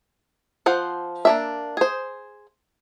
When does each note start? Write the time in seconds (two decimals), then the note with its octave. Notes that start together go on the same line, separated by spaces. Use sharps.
0.66 F3 C5 F#5
1.25 A#3 D4 E5
1.77 G#4 C5